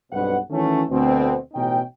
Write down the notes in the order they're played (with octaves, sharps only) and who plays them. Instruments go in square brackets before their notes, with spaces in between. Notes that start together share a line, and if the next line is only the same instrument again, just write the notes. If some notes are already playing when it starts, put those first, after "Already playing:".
[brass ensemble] B1 G2 B2 C4 B4 F#5
D#3 E3 F#3 A3 C#4
D2 B2 C4
A1 B2 C#4 D#4 G5